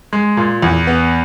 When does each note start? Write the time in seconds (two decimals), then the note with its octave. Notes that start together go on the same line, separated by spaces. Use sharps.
0.13 G#3
0.37 A#2
0.62 E2
0.87 B3